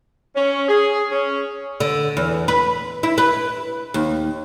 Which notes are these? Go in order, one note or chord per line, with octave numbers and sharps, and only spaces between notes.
C#4
G#4
C#4
D3
E2
B4
E4
B4
D#2